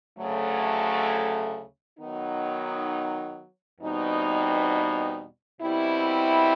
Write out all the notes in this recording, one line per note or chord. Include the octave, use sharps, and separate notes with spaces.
D2 C#3 F#3 A3
D#3 F#3 B3 D#4
E2 B2 G3 C4 D#4
B2 G3 C4 E4